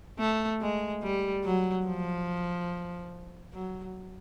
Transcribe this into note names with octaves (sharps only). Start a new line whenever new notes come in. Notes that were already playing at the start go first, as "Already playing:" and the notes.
A3
G#3
G3
F#3
F3
F#3